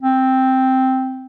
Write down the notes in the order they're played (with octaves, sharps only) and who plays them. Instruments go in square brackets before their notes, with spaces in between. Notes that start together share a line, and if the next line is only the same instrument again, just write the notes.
[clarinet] C4